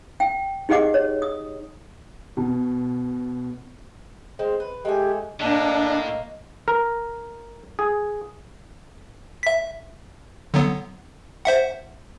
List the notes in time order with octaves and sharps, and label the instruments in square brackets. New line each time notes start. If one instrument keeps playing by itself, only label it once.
[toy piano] G5
D#4 G4 G#4 D#5 F#5 D6
C#5
D#6
[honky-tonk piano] B2
[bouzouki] G#3 C4
B4
[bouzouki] G#3 A3 G#5 [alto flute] G4
[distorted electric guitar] A2 [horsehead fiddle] A#3 [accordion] D4 [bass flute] D#5
[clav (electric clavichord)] A#4
G#4
[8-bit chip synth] E5 B6
D3 F#3 B3
C5 E5 F#5